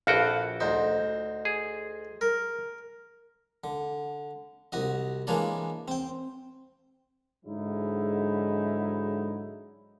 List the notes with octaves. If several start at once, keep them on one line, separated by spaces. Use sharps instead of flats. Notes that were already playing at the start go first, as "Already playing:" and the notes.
A#1 F#4 A4 B4 F5 G5
D2 D#4 C5
G#4
A#4
D3
C2 F#4 D#5
E3 G#3 A#3 D4 C#5 D5
C4 G5
G#2 D3 F#3 G#3 D#4 E4